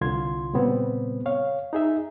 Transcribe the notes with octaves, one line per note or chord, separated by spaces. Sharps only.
C2 D3 F4 C6 G#6
A#2 C#3 G3 B3 C4
C#5 F5
D#4 G#4 E5